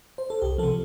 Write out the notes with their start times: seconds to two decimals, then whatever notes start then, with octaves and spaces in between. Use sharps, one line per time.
0.18 C5
0.30 A4
0.42 C2 G4
0.58 C3 F3 A4